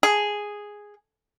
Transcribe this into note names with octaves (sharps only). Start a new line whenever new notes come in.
G#4